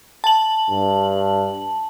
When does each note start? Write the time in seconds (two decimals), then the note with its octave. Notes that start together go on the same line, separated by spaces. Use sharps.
0.24 A5 F#7
0.69 G2